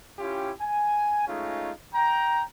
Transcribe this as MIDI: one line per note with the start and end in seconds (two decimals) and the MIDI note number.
0.19 0.52 61
0.19 0.52 64
0.19 0.52 65
0.19 0.52 67
0.61 1.27 80
1.27 1.71 56
1.27 1.71 57
1.27 1.71 61
1.27 1.71 63
1.27 1.71 65
1.94 2.42 79
1.94 2.42 82